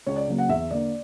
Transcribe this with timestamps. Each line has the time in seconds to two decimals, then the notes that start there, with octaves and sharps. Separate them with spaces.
0.06 C#2 C#5
0.16 D5
0.28 C#3 F#3 A#3
0.38 F#5
0.49 E2 E5
0.71 D3 A#3 D5